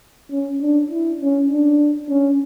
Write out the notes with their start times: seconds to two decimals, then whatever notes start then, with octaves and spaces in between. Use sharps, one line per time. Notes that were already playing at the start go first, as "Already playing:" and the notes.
0.31 C#4
0.61 D4
0.90 E4
1.21 C#4
1.50 D4
2.09 C#4